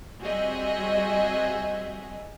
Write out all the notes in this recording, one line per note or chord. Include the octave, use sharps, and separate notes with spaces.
G3 C4 F#4 G#4 D#5 E5